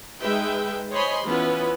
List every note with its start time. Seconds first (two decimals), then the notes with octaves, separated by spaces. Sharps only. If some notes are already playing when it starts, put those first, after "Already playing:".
0.21 G#3 D#4 B4 E5 G5
0.92 C5 C#5 D#5 G#5 B5 C6
1.25 E3 B3 C#4 E4 F4 B4